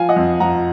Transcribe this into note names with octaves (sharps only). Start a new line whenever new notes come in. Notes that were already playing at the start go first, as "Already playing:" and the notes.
Already playing: F3 F5 G#5
D#5 F#5
F2
F3 F#5 A#5